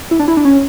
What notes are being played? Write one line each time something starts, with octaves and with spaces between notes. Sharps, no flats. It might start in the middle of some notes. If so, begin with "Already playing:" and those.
E4
D4
E4
D4
C#4